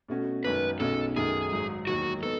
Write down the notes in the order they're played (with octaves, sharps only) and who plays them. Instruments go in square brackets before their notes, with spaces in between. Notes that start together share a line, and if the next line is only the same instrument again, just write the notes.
[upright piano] B2 A3 C#4 F#4
[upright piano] G#1 F#2 D#3 [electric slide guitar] B4
[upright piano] B1 B2 G#3 C#4 [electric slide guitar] A4
[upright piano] F#2 D#3 A3 [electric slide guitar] G#4
[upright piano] G#1 G#2 F#3
[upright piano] E1 D#2 D#3 F#3 [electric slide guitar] F#4
[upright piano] B3 D#4 [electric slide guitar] A4